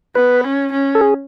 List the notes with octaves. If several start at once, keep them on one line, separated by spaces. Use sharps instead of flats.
B3 B4
C#4
C#4
A4
G#4